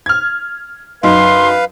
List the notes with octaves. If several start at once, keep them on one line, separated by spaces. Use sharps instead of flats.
F6 G#6
F#2 D#4 B4 F5 C6